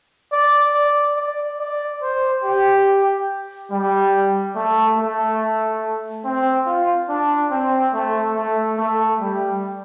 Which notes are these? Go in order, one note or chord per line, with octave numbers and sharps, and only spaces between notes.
D5
D5
D5
D5
C5
G4
G3
A3
A3
C4
F4
D4
C4
A3
A3
A3
G3